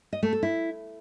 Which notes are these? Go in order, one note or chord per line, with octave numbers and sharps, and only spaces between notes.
D#5
A3
A4
E4